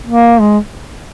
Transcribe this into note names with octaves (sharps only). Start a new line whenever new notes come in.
A#3
G#3